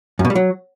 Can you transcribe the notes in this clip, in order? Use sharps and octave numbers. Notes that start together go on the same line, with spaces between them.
F#2
B2
G3
F#3